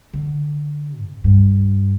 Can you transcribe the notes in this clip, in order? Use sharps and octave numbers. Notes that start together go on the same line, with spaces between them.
D3
F2
G2